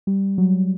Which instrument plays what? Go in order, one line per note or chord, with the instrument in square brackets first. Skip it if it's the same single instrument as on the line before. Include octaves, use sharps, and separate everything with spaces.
[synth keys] G3
F#3